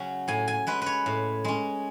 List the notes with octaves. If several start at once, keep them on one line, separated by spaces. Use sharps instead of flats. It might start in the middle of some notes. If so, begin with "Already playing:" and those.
Already playing: C#3 F#3 C#4
A2 G#5
G#5
G#3 C#4 B4
B4 C#5
A2
G#3 C#4